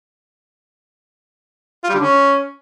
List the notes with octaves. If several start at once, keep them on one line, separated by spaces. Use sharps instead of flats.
F4
G3
D3
C#4